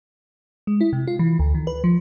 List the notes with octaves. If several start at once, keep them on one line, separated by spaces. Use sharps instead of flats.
G#3
E4
C3
F4
E3
D2
D#3
B4
F3